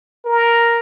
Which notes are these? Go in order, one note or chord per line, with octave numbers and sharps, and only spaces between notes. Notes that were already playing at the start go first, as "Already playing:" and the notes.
A#4